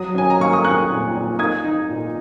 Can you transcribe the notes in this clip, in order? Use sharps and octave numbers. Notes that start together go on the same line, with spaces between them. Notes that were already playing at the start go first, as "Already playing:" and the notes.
Already playing: F#3 D#6
C#4 G#5
A#5
A#3 C#6
D#6
A#3 C#6 F#6
A#2
A#2
D#4 D#6 G#6
D#4
A#2